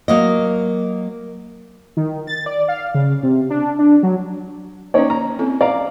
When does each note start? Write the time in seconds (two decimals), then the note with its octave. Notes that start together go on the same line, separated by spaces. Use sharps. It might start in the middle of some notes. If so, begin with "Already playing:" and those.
0.08 F#3 A#3 D#5
1.97 D#3
2.27 A6
2.46 D5
2.68 F5
2.95 C#3
3.23 C3
3.50 D4
3.79 D4
4.03 F#3
4.94 A#3 C#4 D#4 C#5 D5
5.10 A#3 A#5
5.39 C4 E4 A4
5.61 D5 F5 A#5